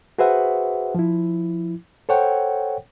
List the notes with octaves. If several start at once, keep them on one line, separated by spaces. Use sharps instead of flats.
F#4 G#4 B4 C5 E5 F#5
F3 E4
A4 C5 C#5 F#5 G5